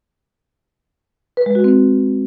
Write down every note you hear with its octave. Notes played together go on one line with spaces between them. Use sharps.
B4
G#3
F#4
C4